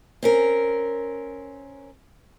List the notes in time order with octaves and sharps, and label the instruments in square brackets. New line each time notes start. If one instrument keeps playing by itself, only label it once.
[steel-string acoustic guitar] C4 C#4 A#4